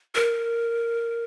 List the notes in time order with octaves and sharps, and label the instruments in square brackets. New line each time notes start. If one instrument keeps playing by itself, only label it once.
[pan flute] A#4